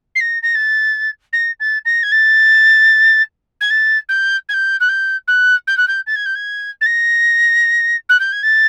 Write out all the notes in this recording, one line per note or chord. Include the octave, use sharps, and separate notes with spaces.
C7
A#6
A#6
A6
A#6
A6
A#6
G#6
A6
G#6
A6
G6
G#6
G6
F#6
G6
F#6
G6
F#6
G6
A6
G#6
G6
G#6
A6
A#6
F#6
G6
G#6
A6